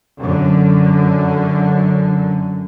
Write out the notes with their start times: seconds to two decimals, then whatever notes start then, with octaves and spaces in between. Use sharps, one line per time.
0.18 F#2 D3